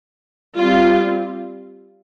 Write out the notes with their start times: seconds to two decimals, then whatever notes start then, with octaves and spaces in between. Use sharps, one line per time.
0.58 G3 C4 F4